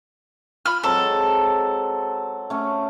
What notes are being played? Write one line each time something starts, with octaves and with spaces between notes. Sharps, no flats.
F4 B5 F6
F#3 G#3 C4 A4
A3 C#4